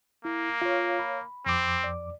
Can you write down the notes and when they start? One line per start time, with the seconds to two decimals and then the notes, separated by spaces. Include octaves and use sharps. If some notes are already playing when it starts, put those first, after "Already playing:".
0.25 A#3 E4
0.62 F4 C#5 F5
0.99 B5
1.46 F2 C4 D6
1.84 D5